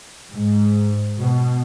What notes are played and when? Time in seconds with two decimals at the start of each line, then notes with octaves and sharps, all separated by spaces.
0.32 G#2
1.18 B2